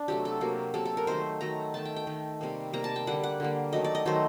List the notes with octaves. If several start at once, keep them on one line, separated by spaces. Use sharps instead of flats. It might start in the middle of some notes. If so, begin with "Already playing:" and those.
Already playing: D4
C3 F#3 A3 G4
A4
C3 F#3 A#3
C3 F#3 A#3 A4
A4
A#4
D#3 F#3 A3 C5
D#3 F#3 A3 A#5
D#3 A3 A5
G5
G5
D#3 A3
C3 G3 A#3
C3 G3 A#3 A#5
A5
G5
D3 G3 A#3 F#5
F#5
D3 G3 A#3
D#3 F#3 A3 D#5
D5
D#5
D#3 F#3 A3 C5